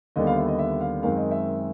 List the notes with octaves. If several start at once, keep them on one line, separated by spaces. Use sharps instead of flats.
D#2 D3 G3 B3 D#5
F5
E5
D#5
E5
F5
F#2 D#3 G#3 C4 F5
D#5
E5